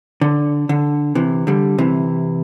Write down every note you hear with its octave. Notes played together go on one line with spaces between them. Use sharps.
D3
D3
C3 E3
D3 G3
C3 E3